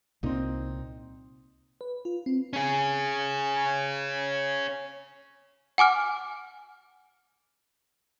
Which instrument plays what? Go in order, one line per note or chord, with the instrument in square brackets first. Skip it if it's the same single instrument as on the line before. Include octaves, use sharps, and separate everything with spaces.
[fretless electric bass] C2 A#2 [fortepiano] C4 D#4
[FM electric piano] B4
F4
C4
[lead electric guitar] C#4 G#4
[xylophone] F#5 G#5 D6 F6